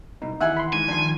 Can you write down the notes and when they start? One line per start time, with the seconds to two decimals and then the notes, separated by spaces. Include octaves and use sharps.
0.22 C2 B2 D#4
0.41 D#2 E3 E5 F#5 G#5
0.57 B5 C6
0.73 G#2 G#5
0.88 D#3 F3 D4 C6